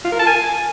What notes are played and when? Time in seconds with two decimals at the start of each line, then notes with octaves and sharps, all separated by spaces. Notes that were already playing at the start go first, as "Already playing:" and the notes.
0.04 F4
0.12 A#4
0.20 A5
0.27 G#5